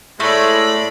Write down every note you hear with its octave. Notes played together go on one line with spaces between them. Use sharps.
A2 G#3 A3 D5 B5